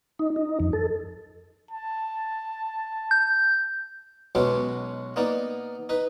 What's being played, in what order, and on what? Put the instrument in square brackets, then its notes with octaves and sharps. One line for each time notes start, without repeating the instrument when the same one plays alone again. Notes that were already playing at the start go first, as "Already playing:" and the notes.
[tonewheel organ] D#4
D#4
F2
A4
[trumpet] A5
[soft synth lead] G6
[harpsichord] B1 B2 F#3 G#3 C#4 D6
A#3 B3 D#4 D5
D#4 B4